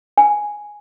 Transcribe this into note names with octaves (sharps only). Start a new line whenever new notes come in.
G#5